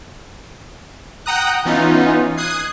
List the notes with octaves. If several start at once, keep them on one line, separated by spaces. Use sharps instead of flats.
F#5 G5 A#5 D#6 F#6
E3 B3 C#4 D#4 F4
D#6 F#6 G#6 C7